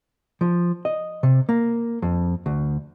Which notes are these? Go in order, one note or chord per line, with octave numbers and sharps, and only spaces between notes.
F3
D#5
C3
A#3
F2
D2